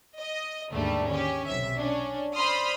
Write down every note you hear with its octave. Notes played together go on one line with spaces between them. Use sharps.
D#5
D#2 G#2 D3 G3 A3
C#4 G4
B1 C3 E5
C#4 D4
C5 D5 B5 C6 D#6 F6